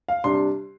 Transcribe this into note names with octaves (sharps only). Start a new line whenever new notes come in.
F5
C3 G3 D4 C6